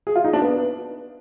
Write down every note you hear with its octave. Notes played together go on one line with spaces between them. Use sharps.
G#4
F4
D#4
D4
B3